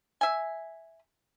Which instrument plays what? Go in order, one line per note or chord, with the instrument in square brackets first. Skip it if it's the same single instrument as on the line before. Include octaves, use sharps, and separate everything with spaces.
[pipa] E5 G#5